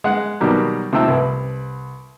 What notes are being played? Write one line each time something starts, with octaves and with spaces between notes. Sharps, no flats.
G#3 F#5
B2 D#3 F#3 G3 A#3
C3 F3 A3 D#4 G5 E6
C2 B4